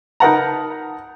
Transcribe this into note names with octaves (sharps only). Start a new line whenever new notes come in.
D#4 A#4 B4 F#5 A5 A#5